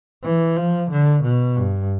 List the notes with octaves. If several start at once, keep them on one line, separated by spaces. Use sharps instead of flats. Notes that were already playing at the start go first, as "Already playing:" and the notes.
E3
F3
D3
B2
G2